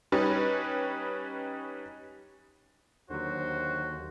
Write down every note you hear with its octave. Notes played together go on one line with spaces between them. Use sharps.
G3 C#4 D#4 B4
D#2 D3 F#3 F#4 C5